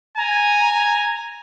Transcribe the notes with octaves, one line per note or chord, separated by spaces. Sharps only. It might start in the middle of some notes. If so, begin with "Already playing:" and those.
G#5 A#5